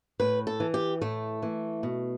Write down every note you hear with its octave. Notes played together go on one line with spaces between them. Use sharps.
A2 B4
A4
E3
G4
A2 A3
E3
B2